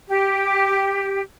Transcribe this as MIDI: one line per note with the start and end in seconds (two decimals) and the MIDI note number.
0.09 1.21 67